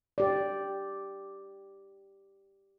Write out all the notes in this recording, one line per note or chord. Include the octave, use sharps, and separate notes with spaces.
G4 D5